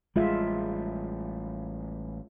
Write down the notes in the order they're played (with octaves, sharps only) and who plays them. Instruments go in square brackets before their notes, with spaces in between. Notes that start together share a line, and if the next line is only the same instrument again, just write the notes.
[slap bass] A1 G3 [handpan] G#3 F4 E5